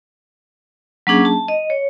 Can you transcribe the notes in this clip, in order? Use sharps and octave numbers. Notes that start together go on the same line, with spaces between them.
F#3 A#3 C#4 D4 G#4
A5
D#5
C#5